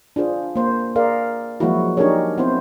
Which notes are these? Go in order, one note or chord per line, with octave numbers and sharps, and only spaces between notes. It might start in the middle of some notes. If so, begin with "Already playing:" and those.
D4 F4 G#4 C5
A#3 C5
G#4 A#4 D5 F5
F3 F#3 G#3 A#3 E4 F#4
D4 D#4 G4 G#4 A#4 C#5
B3 C4 E4 C5